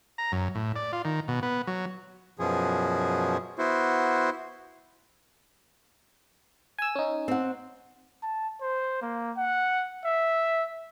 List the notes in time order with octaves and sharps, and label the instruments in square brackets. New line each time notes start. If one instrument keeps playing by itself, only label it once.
[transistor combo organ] A#5
F#2
A2
D5
F4
D#3
B2
B3
F#3
[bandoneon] F#2 B2 F3 G#4
B3 E4 F#4 C5
[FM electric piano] G#5 E6
C#4 D#4
[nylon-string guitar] C4 F#5
[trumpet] A5
C5
A#3
F#5
E5